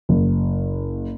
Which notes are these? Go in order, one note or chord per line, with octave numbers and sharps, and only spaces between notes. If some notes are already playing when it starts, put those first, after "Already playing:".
F#1